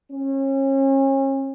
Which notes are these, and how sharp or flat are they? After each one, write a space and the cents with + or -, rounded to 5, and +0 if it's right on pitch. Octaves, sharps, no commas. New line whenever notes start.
C#4 -35